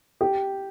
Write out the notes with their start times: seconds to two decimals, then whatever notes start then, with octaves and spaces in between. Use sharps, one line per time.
0.21 G4